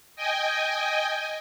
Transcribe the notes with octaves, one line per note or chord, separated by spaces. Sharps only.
D#5 G5 G#5